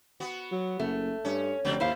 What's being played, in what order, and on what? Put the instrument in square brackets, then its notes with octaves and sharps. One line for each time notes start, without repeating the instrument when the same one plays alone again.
[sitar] B3 F#4
[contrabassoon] F#3
[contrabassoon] F#1 [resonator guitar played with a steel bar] A3
[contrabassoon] G2 [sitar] C#4 [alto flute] C#5
[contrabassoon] F1 [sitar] C#3 F#3 C4
[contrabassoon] D#2 [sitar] G#2 [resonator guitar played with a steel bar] E4 C5 F5